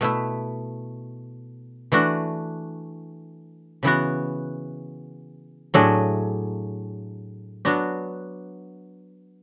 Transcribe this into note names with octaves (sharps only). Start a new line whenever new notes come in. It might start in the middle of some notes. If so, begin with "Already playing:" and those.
B2 A3 E4
E3 A3 D4 F#4
C#3 E3 B3 F#4
A2 F#3 A3 D4 G#4
F#3 B3 D4 F#4